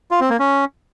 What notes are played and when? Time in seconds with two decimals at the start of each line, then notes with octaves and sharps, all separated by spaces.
0.11 F4
0.20 C4
0.30 A#3
0.39 C#4